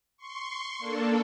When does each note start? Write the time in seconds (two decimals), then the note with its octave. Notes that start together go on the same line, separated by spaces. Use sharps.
0.17 C6 C#6
0.79 A#3 D4 A4